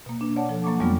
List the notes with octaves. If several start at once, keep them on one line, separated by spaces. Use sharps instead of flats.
B2 A#3
D4
C#5 D5 F#5 A5
F3 A4
F#3 A#3 C#6 D6
F2 G3 G#3 B3 F4